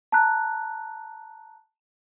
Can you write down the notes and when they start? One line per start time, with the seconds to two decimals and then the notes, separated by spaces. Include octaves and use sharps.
0.12 A5 A#5 F#6